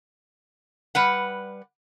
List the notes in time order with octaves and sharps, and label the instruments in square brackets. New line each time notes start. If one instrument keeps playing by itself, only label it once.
[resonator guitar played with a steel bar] G3 B4 F#5